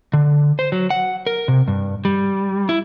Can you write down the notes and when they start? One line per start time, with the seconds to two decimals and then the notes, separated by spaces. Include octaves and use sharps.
0.13 D3
0.59 C5
0.72 F#3
0.90 F#5
1.27 A#4
1.48 C3
1.68 G2
2.05 G3
2.69 E4